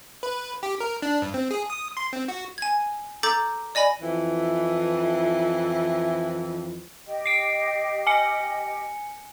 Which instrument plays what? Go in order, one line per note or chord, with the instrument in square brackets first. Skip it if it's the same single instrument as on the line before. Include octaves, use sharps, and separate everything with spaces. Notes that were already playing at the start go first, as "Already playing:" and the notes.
[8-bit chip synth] B4
G4
A#4
D4
G2
C4
G#4
D#6
C6
C4
F#4
[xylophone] G#5 G#6
A4 A#5 D6 G6 A6
D5 D#5 G#5 B5
[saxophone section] F2 E3
[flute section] G4 D#5 G5
[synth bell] C7 D7
G#5 C#7